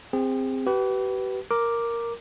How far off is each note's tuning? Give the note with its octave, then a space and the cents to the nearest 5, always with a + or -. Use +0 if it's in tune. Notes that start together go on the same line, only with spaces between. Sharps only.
C4 -5 G#4 -35
G4 -40 B4 +0
A#4 +0 D6 +0